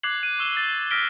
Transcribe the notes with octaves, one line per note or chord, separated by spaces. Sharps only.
D6 F#6 G#6 C7 F#7
F#6 D#7
C#6 E6 E7 G7
E6 A6
E6 F6 A#6 B6 D7 G7